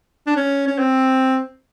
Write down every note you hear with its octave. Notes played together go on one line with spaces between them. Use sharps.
D4
C#4
C#4
C4